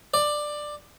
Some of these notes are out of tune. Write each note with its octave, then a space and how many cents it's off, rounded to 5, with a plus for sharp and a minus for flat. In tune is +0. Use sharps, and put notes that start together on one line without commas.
D5 +15